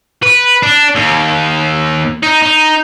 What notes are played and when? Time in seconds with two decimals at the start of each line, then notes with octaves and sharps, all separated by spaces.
0.23 B4
0.63 D4
0.95 D#2
2.23 D#4
2.43 D#4